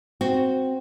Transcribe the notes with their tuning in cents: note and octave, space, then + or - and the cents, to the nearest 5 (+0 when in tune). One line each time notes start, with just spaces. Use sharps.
C4 +0 F#4 +0